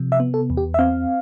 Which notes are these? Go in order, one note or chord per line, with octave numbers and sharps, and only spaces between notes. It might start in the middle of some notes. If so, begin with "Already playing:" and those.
Already playing: C3 F3
E5
B3
A4
E2
G4
E5
C4 F5